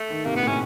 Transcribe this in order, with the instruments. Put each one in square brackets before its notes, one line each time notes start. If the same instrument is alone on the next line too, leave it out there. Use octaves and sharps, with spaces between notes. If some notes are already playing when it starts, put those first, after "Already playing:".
Already playing: [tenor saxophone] A3
[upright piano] D#3
[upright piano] C3 [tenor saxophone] A#3
[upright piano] A#2 [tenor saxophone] B3
[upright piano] A2
[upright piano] A#2 [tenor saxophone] C#4